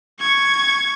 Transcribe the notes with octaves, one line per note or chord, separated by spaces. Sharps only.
C#6 G#6